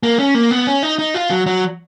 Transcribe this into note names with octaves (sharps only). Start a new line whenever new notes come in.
A#3
C#4
A#3
B3
C#4
D#4
D#4
F4
F#3
F#3